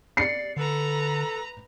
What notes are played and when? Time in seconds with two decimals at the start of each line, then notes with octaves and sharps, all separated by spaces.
0.17 D5 C7 C#7
0.57 D3 A4 B4 A#5